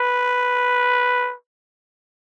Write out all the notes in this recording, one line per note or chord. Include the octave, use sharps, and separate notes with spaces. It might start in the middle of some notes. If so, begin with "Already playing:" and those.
Already playing: B4